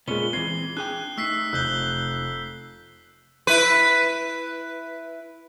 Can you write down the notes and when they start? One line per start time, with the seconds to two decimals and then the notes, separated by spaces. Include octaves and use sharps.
0.08 A#2 G#3 B3 C#4 G7
0.33 E3 C4 G#6 C7
0.77 D4 G#4 G5 F#6
1.18 A3 D#4 E6 B6 C7
1.53 F1 E6 F#6 G6 G7
3.47 E4 B4